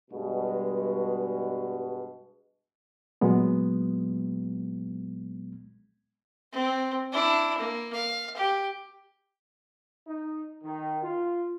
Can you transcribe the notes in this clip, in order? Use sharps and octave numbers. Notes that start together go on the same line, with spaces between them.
G2 B2 G#3
A#2 F#3 G#3 B3
C4
D4 E4
A#3
F5
G4
D#4
D#3
F4